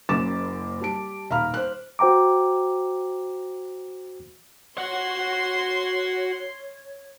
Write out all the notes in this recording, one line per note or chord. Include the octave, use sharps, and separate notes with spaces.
F#1 F#2 D6 A6 E7
G3 A5 D7
D#1 F5 A#5 B5 F6
C5 F#6
F#4 C5 G5 A#5 D6
F#4 C#5 F#5 C6